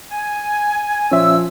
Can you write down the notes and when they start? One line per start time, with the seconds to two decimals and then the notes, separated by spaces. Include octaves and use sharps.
0.11 G#5
1.12 A#2 F3 C#4 E5 E6